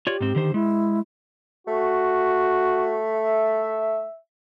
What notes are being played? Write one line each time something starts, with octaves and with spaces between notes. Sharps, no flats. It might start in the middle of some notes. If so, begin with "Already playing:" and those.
F4 G4 C#5 D5
G#2 C4
D3 D#3 C5
G#3 E4
A3 F#4
E5